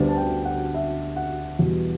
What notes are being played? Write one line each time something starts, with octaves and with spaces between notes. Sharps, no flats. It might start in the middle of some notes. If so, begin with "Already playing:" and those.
Already playing: D2 D3 G3 B3 D4
A5
G5
F#5
E5
F#5
E2 B2 G3